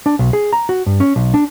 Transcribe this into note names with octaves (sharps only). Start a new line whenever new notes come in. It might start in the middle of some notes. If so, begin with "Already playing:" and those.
D4
B1
G#4
A#5
F#4
G2
C#4
B1
D4